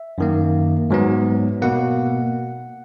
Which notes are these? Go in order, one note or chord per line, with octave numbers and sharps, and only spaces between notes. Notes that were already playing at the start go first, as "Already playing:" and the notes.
Already playing: E5
F#2 D#3 A#3
G#2 F#3 B3
B2 A#3 F#5